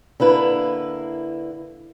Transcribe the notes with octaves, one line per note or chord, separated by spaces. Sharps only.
D3 A#3 E4 B4